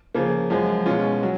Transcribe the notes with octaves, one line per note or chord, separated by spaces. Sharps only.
C#3 F3 A#3
F#2 F3 G#3
B2 G#3 C#4 F4
F#3